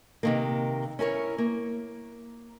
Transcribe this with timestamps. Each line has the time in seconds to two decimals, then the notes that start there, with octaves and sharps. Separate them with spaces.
0.23 C3 D#3 A#3
0.99 C#4 E4 A#4 C#5
1.38 A#3